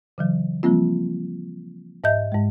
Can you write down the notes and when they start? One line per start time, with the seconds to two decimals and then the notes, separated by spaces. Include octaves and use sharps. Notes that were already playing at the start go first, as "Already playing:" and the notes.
0.18 C#3 E3 F#3
0.63 F3 G3 A#3 C4 F4
2.04 G#2 D#5 E5 G6
2.32 G#2 G#3